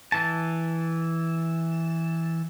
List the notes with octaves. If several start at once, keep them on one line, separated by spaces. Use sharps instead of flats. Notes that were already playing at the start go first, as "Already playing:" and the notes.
E3 A5